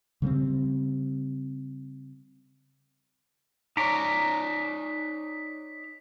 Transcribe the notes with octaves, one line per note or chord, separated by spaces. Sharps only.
C#3 G3 A3 C4
D#4 C#5 D5 A#5 D6 B6